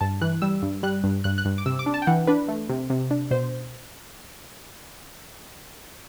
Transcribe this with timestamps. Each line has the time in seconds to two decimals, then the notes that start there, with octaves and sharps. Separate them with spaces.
0.01 G2 A5
0.21 E3 F#6
0.42 G3 E6
0.62 G2
0.83 G3 F#6
1.04 G2
1.24 G2 F#6
1.38 F#6
1.45 G2
1.58 D6
1.66 C3 E6
1.79 D6
1.86 D4
1.94 A5
2.02 G5
2.07 E3 F#5
2.27 D4 B4
2.48 A3
2.69 C3
2.90 C3
3.11 D4
3.31 B2 C5